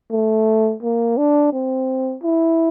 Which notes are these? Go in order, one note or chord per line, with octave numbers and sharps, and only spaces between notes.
A3
A#3
D4
C4
E4